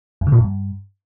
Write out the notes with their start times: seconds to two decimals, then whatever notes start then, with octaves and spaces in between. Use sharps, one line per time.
0.21 F2
0.27 D3
0.32 A#2
0.38 F2
0.43 G2